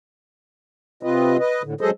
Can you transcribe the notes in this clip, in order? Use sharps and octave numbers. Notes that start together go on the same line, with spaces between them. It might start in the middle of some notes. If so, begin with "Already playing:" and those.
C3 C4 F4 B4 D#5
B4 D#5
A2 D3
F#3 G#3 G#4 A4 C5 D#5